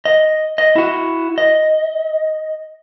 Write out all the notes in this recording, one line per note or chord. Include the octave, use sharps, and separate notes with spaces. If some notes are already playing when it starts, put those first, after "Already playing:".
D#5
D#5
E4 F#4
D#5